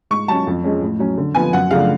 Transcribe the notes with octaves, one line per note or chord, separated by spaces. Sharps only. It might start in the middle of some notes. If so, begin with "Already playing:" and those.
G#2 C#6
F#3 C#4 A5
F2
F3 G#3 C#4
A2
F#3 C#4
D3
F3 B3 G#5
F#2 F#5
C#3 F3 A3 D4 F5